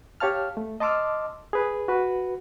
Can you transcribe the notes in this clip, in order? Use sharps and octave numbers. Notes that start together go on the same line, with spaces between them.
G4 C#5 F5 A5 F6
A3
D#5 A5 C6 D6 E6 F6
G#4 B4
F#4 B4